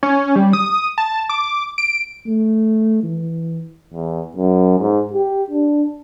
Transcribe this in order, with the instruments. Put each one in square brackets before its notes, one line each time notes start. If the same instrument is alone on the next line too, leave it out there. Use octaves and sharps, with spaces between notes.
[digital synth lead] C#4
G3
D#6
A5
D6
D7
[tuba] A3
E3
[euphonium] E2
F#2
G#2
G4
D4